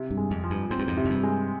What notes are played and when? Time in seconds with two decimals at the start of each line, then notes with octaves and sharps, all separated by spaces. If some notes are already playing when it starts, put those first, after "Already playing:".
Already playing: C3
0.11 G2
0.17 G#3
0.31 F2
0.44 F3
0.50 G2
0.70 G#2 C4
0.79 G2
0.87 F2 G#2
0.97 C3
1.05 F2
1.10 G2
1.23 G#3